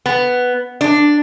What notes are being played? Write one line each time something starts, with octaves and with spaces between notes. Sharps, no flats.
B3
D4